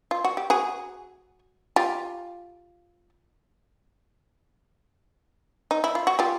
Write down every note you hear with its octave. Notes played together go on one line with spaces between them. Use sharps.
F4
F#4
G4
F#4 G#4
F4 G4
D#4
E4
F4
F#4
F4 G4